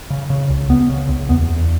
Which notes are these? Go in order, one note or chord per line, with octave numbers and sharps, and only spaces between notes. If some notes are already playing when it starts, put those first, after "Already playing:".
C#3
C#3
C#2
C#2 B3
C#3
C#2
E2 B3
E2